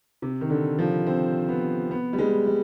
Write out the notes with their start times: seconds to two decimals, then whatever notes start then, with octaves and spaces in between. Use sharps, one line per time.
0.22 C3
0.41 D#3
0.50 D3
0.79 F3
1.07 C4
1.49 B3
1.91 B3
2.13 G3
2.19 G#3
2.46 G3